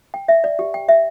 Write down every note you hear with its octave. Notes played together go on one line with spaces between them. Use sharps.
G5
E5
D5
G4
G5
E5